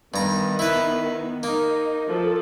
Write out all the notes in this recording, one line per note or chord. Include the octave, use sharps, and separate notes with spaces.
G2 D#3 B3 A#5
E4 B4
A#3 D#4
F3 A4